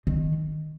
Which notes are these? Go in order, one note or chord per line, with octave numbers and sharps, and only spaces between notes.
D#3